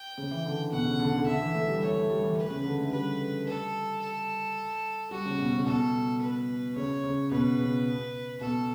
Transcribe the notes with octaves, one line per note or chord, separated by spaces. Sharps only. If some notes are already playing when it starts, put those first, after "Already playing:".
Already playing: G5
C#3
E3
D3
B2 F#5
C#3
D3
D3
D3 E5
E3
A3
G3
A3 C#5
A3
G3
E3
B4
C#3
D3
A3
G3 B4
A4
A4
G3 F#4
C#3
B2
C#3
B2 A4
B4
C#3 C#5
C#3
B2 B4
C#3
B2 A4